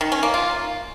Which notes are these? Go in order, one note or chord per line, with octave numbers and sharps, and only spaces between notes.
D#3
C#4
A#3
F4